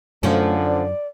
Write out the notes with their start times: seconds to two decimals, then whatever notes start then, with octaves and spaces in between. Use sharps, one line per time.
0.23 F#2 D3 F3 A3 C#4
0.66 D5